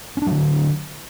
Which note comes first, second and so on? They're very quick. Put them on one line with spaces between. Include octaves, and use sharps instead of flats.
C#4 D4 F#3 D3